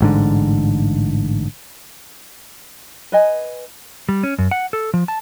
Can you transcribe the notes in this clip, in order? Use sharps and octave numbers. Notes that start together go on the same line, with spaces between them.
A1 G#2 D3
B4 D#5 G#5
G3
C#4
F#2
F#5
A4
F3
A5